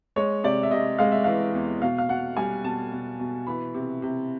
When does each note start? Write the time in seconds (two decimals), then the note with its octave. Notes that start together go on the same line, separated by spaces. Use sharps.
0.16 G#3 C#5
0.44 C3 D5
0.63 E5
0.71 C3 D#5
0.99 G#3 F5
1.12 E5
1.24 E3 F5
1.54 E2
1.82 B2 F5
1.98 F5
2.09 B2 F#5
2.37 G3 G#5
2.64 B2 A5
2.92 B2
3.20 B2
3.47 E3 B5
3.74 C3
4.02 C3